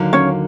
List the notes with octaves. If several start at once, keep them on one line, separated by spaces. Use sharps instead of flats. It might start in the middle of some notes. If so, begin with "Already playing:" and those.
Already playing: D#2 D3 F#3 A#3
C#4 C#5